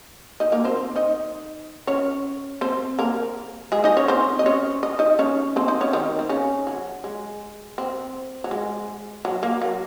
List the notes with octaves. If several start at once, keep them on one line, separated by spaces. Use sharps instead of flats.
D#4 D#5
A#3 A#4
C4 C5
D#4 D#5
C#4 C#5
C4 C5
A#3 A#4
G#3 G#4
D#4 D#5
C#4 C#5
C4 C5
D#5
C#4 C#5
D#5
D#4 D#5
C#4 C#5
C4 C5
D#4 D#5
C#4 C#5
D#3 D#4
C4
C#3 C#4
F#3
G#3
C4
F#3
G#3
F#3
A#3
F#3